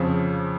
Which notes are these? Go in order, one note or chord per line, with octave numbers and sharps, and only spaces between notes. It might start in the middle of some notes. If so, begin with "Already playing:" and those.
Already playing: F2 C#3 F3